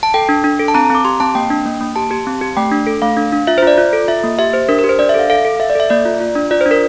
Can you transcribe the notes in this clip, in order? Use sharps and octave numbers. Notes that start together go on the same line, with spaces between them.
A5
A4 G5
D4
D4
A4
A5
C4 A#5
A#5
C4 D6
G4 C6
C4 A5
A#3 G5
D4
A#3
A#3
G4 A5
G4
C4
G4
A3 G5
D4
A4
A3 F5
D4
D4
F4 E5
C5
F4 D5
F4
A4
F4 E5
A#3
G4 E5
G4 C5
D4 A#4
A#4
G4
C5
D4 D5
E5
A4 F5
A4 F5
A4
A4 E5
D5
A4 E5
A#3 D5
F4
F4
D4
F4 D5
C5
D4
A#4